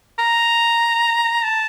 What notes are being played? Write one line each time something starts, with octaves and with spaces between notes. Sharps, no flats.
A#5
A5